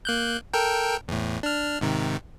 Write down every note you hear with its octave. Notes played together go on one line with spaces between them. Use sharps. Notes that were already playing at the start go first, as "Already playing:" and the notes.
A#3 F#6 G6
A4 A#4 G5
E2 A2
D4 F6
G#2 C3 D#3